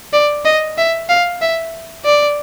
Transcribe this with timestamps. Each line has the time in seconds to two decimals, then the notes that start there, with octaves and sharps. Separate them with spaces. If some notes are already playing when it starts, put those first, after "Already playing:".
0.13 D5
0.45 D#5
0.78 E5
1.09 F5
1.41 E5
2.05 D5